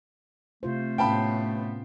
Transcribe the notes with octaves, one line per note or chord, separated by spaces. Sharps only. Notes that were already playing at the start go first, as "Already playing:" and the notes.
C3 A3 F4 C5
A2 B3 C#4 C5 F5 G5 A5 B5